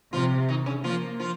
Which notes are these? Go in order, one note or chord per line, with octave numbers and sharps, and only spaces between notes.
C3 F3 F4
D#3 D#4
C#3 C#4
F3 A#3 F4
F3 F4